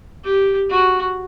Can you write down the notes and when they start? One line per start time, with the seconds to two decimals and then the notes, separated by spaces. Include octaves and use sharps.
0.24 G4
0.70 F#4